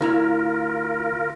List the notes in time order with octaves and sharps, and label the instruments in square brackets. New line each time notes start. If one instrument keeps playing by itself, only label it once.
[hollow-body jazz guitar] D2 E4 A#5 [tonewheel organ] F4 A#4